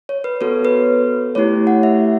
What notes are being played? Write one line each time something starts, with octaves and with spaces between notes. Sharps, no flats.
C#5
B4
B3 F#4 A4 C#5
B4
A3 E4 G4 C#5
F#5
E5